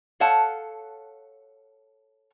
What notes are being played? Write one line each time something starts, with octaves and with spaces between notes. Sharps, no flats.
A4 C#5 F5 F#5 A5